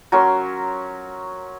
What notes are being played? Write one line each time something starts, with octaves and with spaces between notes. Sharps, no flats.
F#3 C#4 A#4 C6